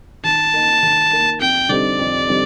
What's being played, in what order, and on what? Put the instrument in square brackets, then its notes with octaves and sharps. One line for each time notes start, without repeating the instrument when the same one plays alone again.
[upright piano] D#3 [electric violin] A5
[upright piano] A#3 D#4
D#3
A#3 D#4
[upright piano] F2 [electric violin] G5
[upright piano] D3 G3 C4 D#4 [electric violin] D5
[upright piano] F2
D3 G3 C4 D#4